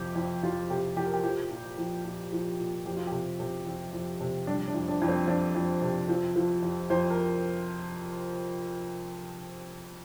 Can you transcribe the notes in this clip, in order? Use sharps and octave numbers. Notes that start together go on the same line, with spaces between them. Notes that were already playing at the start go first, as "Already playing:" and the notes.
Already playing: F2 C3 G4
F2
F2 F4
C3 G4
F2 G4
A#4
G4
F3 G4
A#2
F3
A#2
F3
A#2
F2 G4
F4
C3 G4
C3
F2
F2
C3
G3 D4
D4
F2
D4
F2
C4
F2 D4
F2
C3
F3
F3
F2
F2 C5
A#4